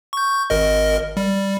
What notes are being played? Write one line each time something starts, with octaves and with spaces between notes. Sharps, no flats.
C#6 G6
G#1 A#4 D#5
G3